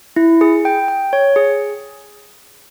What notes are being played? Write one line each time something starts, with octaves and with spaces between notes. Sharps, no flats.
E4
G#4
G5
G5
C#5
G#4